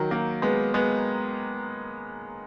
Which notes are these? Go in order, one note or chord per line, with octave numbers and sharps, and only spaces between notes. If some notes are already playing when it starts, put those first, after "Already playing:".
Already playing: D#3 F#3
F#3 A#3
G#3 B3
G#3 B3